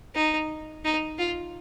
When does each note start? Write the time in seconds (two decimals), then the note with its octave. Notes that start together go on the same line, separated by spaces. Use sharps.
0.14 D#4
0.84 D#4
1.18 F4